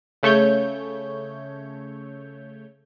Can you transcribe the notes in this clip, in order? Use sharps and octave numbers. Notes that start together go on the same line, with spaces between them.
C#3 A3 C#5 G6